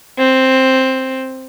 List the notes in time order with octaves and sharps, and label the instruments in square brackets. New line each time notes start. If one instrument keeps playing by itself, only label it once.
[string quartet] C4